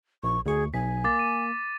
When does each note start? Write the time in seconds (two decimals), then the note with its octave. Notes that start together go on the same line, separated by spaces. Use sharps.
0.23 A#1 C#6
0.46 D2 G#4 C#6
0.74 B1 G#5 B6
1.04 A#3 D6 A6
1.19 D#7